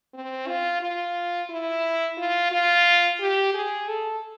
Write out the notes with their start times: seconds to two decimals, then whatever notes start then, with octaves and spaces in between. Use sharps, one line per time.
0.14 C4
0.47 F4
0.81 F4
1.50 E4
2.18 F4
2.52 F4
3.20 G4
3.54 G#4
3.89 A4